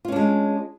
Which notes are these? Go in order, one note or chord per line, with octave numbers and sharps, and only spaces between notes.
G#3 C#4 D4 F4